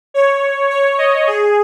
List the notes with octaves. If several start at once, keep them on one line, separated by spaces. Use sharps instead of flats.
C#5
C#5
D#5
G#4